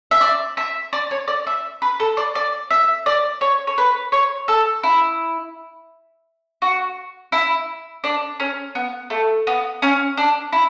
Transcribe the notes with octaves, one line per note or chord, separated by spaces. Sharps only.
E5
D5
E5
D5
C#5
D5
E5
B4
A4
D5
D5
E5
D5
C#5
C#5
B4
C#5
A4
E4
F#4
E4
D4
C#4
B3
A3
B3
C#4
D4
E4